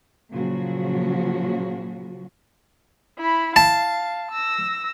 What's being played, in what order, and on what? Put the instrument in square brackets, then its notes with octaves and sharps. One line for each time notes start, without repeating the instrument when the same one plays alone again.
[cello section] A#2 C#3 F3 F#3 F#4
[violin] E4 B5
[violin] F5 [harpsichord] A5
[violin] E6 A#6